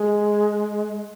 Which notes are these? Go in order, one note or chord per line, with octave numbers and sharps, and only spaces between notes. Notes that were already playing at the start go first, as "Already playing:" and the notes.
Already playing: G#3